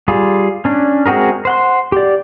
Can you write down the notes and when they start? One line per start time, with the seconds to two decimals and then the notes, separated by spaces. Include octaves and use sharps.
0.08 G3 F4 G#4
0.65 C#4 D4
1.06 G#3 C4 F#4 G#4 A#4
1.45 C5 F#5 C6
1.92 G4 D5